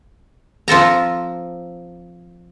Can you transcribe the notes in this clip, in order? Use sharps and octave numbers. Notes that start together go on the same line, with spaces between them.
F3 C4 A4 A#5